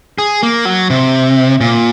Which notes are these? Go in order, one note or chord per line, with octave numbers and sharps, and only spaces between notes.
G#4
A#3
F#3
C3
A#2